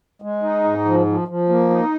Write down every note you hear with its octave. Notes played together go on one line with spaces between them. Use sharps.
G#3
D#4
G#2
F3
F3
F3
A#3
D#4